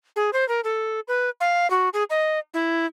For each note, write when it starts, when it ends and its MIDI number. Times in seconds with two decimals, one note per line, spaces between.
0.16 0.30 68
0.33 0.47 72
0.48 0.61 70
0.64 1.00 69
1.08 1.30 71
1.41 1.69 77
1.70 1.89 66
1.93 2.04 68
2.10 2.39 75
2.54 2.86 64